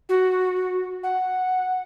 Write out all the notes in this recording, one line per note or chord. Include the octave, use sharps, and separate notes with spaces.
F#4
F#5